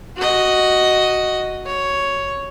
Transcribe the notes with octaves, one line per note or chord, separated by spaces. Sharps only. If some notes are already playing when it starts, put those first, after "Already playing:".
F#4 D#5
C#5